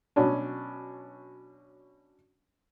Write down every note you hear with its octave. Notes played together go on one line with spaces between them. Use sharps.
B2 F#3 C#4 D4